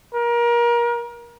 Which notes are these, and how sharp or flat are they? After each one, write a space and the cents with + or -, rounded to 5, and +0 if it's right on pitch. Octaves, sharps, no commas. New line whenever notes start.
A#4 +30